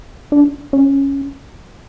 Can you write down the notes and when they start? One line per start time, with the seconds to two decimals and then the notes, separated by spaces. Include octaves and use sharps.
0.32 D4
0.73 C#4